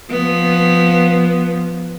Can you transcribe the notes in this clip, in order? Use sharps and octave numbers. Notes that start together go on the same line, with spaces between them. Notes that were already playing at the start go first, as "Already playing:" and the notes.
F3 B3